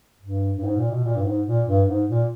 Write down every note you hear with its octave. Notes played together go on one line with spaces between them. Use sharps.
G2
G2
G#2
A#2
B2
A#2
G2
G#2
A#2
G2
G#2
A#2